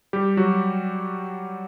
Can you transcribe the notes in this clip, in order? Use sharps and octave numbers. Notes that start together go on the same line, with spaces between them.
G3 G4
F#3 F#4